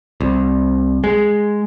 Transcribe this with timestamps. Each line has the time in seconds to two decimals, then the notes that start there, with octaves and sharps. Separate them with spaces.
0.21 C2
1.04 G#3